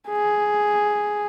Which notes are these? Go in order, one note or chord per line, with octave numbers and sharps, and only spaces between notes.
G#4